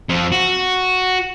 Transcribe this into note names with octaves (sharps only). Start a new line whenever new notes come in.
F2
F#4